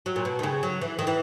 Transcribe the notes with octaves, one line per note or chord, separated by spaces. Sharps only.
F#3
A#2
B2
D#3
C#3
F#3
E3
D#3
E3